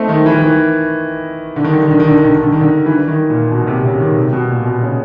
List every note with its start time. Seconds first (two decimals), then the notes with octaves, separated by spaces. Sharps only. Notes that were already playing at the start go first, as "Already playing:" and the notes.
Already playing: A3 C4 D#4
0.09 D#3
0.26 E3
0.34 D#3
0.42 E3
1.56 D3
1.64 D#3
1.73 D3
1.82 D#3
1.91 D3
2.00 D#3
2.08 D3
2.18 D#3
2.25 D3
2.35 D#3
2.43 D3
2.52 D#3
2.61 D3
2.86 E3
3.08 D#3
3.30 A#2
3.51 B2
3.67 C3
3.85 C#3
4.00 D#3
4.16 C3
4.33 B2
4.49 A#2
4.65 B2
4.82 C#3